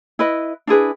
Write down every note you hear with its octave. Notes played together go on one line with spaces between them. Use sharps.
E4 B4 D#5
D4 E4 G#4 B4